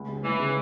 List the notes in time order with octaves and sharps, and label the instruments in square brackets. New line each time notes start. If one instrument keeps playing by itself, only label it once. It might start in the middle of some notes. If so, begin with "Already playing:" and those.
Already playing: [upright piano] C#2
C#3 G#3
[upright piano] C#2 [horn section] E3
[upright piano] C#3 G#3